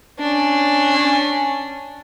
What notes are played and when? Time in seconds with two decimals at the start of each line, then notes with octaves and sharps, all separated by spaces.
0.19 C#4 D4